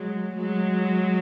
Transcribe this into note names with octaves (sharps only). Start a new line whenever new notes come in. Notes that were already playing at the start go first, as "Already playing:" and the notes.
Already playing: F#3 G#3
F#3 G#3